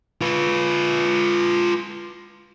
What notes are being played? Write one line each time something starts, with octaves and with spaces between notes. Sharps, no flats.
F4 B4